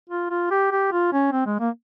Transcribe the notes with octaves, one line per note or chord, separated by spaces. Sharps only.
F4
F4
G4
G4
F4
C#4
C4
G#3
A#3